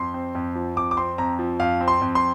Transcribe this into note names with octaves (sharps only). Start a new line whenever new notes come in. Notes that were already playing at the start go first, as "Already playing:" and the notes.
Already playing: F2 C6
C4
F2
F3
F2 D6
D6
C4 C6
F2 A#5
F3
F2 F5
C4
C6
F2
C6